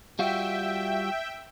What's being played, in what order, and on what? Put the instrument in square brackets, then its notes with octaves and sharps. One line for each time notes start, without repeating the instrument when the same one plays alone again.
[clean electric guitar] G3 F4 F#4 [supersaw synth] E5 G5